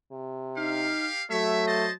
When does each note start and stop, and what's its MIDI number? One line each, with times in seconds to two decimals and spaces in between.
0.12 0.92 48
0.57 1.09 63
0.57 1.23 67
0.57 1.23 77
1.31 1.92 54
1.31 1.86 57
1.31 1.65 73
1.31 1.65 76
1.67 1.93 72
1.67 1.93 75
1.67 1.93 81